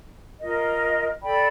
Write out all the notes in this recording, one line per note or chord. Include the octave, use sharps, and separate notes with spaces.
F4 A#4 D#5
A4 D5 G5 B5